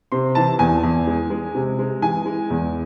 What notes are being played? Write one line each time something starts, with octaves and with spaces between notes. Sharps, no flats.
C3 C6
E3 A5
E2 G#5
E2
G#3
G#3
C3
G#3
E3 G#5
G#3
E2